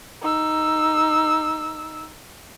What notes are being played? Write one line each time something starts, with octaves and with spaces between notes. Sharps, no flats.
D#4 E6